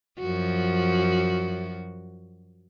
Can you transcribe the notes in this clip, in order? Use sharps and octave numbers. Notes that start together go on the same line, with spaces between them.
F#2 F3 F#4